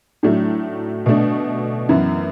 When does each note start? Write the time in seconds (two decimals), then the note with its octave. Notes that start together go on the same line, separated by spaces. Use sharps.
0.23 A2 F#3 A3 D4
1.06 B2 A3 D4
1.89 F#2 E3 B3 E4